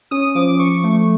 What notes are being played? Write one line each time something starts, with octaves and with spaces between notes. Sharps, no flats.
C#4 D#6
F3 D6
F3 C#6
A3